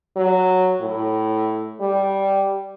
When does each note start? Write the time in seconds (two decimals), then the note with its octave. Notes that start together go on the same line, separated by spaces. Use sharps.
0.16 F#3
0.81 A2
1.80 G3